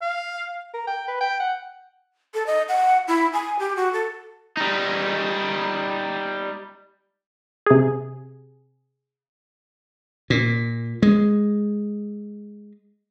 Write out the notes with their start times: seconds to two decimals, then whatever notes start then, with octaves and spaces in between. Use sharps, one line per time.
0.01 F5
0.74 A#4
0.87 G5
1.08 B4
1.21 G5
1.40 F#5
2.34 A4
2.47 D#5
2.69 F#5
3.08 E4
3.33 G#5
3.59 G4
3.76 F#4
3.93 A4
4.57 G3 D#4
7.66 C3 G#4
10.30 A#2
11.02 G#3